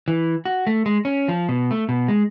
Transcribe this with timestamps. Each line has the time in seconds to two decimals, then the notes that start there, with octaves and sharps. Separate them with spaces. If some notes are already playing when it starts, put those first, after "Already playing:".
0.08 E3
0.45 F#4
0.67 A3
0.86 G#3
1.05 C#4
1.28 F3
1.49 B2
1.71 A3
1.89 B2
2.08 G#3